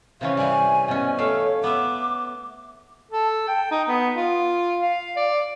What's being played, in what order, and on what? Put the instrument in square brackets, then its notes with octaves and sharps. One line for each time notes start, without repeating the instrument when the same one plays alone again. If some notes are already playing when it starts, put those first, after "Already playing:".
[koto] C3 E3 C#4 [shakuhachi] F5
[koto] E3 G3 [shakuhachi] G#5
[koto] B2 C#4
[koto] A3 F5 [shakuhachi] C#5
[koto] B3 E5 [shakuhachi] D6
[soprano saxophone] A4
G5
D#4
B3
F4
F5
D5